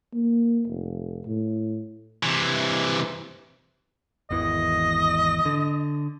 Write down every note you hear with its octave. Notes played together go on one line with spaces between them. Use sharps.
A#3
F1
A2
C3 E3
G#1 E2 E3 D#5
D3